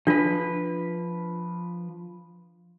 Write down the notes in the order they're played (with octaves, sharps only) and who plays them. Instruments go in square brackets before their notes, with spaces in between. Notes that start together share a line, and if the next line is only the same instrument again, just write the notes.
[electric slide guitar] F3 B4 [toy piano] D4 F4